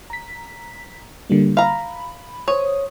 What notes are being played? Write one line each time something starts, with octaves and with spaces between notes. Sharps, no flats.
A#5 B6
D3 G3 A#3
F5 A#5 B5
C5 C#5 D#6